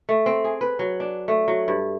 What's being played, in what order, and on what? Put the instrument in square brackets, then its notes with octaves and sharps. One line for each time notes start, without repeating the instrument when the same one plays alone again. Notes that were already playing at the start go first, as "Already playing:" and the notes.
[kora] A3
C4
G#4
B4
F#3
D4
A3
F#3
G2